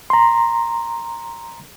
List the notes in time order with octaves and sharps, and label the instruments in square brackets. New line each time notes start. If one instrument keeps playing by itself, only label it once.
[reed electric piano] A#5 C6